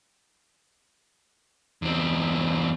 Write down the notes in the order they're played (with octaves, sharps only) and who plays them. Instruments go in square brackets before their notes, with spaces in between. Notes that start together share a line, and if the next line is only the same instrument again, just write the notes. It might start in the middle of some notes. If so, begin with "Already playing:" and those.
[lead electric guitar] E2 C4